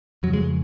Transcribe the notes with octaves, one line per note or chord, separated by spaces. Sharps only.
F2 C#3 F#3
G#3